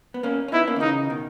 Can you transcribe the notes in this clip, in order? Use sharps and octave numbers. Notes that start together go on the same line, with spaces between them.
B3
A#3 C#4
C#4
B3 D#4 E4
A#3 C#4
D#3
C#3 E3 D#4
B2 D#3